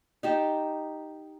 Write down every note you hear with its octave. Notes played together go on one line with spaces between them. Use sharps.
D#4 G4 A5